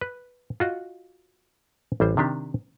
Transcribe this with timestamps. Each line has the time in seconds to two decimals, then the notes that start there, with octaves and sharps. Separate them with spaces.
0.01 B4
0.60 F4 F#4 D#5
2.00 A1 G3 C5
2.17 C3 D#3 D4 G4